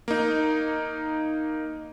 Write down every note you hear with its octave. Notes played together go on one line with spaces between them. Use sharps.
A#3 D#4